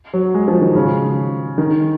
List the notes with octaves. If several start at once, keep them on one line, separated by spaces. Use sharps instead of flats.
F#3
G#3
F3
D#3
C#3
D#3